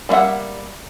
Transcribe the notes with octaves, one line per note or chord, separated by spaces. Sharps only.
G3 A#3 A#4 E5 F#5